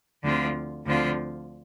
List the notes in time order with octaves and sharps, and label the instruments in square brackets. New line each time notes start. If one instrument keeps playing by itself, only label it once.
[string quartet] D2 D3 F3 C4 F4
D2 D3 F3 C4 F4